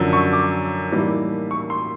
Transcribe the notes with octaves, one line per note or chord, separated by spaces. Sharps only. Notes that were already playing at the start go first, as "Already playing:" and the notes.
Already playing: F#2 D3 F3
C#6
D6
A2 E3 G3 A#3 D#4
C#6
C6